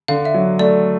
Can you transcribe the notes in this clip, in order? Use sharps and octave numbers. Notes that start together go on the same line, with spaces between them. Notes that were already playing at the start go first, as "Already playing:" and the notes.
D3 F5
E5
F#3
A3 D5